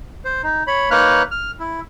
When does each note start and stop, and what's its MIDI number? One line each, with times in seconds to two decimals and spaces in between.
0.25 0.42 72
0.43 0.63 63
0.67 0.90 73
0.67 0.90 83
0.91 1.23 58
0.91 1.23 63
0.91 1.23 71
0.91 1.23 73
0.91 1.23 89
0.91 1.23 90
1.31 1.51 89
1.60 1.80 64